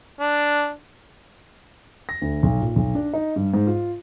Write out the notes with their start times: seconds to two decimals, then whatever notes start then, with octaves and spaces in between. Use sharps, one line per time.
0.20 D4
2.09 A#6
2.22 D2
2.43 B1
2.61 A#2
2.76 B1
2.95 D4
3.14 D#4
3.36 G2
3.54 G#2
3.67 F4